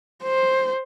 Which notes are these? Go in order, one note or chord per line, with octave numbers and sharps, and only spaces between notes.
C5